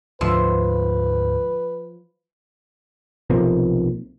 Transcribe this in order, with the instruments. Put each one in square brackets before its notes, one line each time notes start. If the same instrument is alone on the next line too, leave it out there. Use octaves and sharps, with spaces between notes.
[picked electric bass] D2 G#2 D3 [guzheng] F3 E5 [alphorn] B4
[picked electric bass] B1 C3 F3 A#3